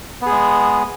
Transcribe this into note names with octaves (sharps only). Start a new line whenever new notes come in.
G#3 B3 G#4